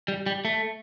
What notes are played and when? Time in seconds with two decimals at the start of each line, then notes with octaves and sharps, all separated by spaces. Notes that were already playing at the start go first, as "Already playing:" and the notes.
0.08 G3
0.26 G3
0.45 A3